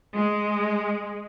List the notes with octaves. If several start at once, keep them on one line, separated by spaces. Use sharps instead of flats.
G#3